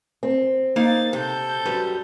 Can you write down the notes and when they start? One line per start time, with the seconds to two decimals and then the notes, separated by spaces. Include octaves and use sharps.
0.23 C4
0.76 A#3 D#4 F5 A6
1.13 C3 A4 G6
1.66 F#2 G3 B4